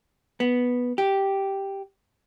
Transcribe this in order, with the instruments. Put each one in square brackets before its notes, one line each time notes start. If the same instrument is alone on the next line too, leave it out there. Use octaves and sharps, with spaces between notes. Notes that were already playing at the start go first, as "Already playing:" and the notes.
[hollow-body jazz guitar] B3
G4